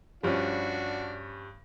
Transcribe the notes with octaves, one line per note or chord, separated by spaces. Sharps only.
G2 F3 G3 C#4 D4 F#4